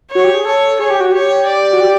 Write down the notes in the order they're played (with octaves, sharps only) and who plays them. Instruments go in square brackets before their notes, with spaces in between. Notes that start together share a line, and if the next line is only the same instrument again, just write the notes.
[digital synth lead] F#4 [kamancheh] C#5
[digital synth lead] G4
G#4
[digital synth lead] A4 [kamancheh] C#5
[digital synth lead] G#4 [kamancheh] C#5
[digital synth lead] G4
F#4
[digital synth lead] G4 [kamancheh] C#5
[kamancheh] D5
[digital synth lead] F#4
G4